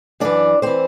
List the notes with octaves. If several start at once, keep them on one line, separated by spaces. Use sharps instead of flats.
F#2 E3 D4 D5
E3 C4 C5